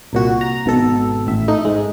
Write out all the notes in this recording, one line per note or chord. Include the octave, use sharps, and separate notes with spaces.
C2 A#2 F#4
A#5
G#1 B2 A4
A1 E5
A3 D#4
G#2 G#3